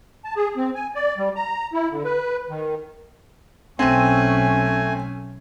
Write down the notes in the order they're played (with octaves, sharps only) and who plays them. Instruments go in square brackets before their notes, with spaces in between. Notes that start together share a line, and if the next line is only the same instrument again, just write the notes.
[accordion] A5
G#4
C4
G#5
D5
G3
A#5
E4
D3
B4
D#3
[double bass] B1 C#4 [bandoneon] A3 G#5 [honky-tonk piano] C4 D#7